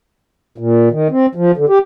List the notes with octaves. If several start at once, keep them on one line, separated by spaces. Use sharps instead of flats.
A#2
D#3
C4
F3
D3
G4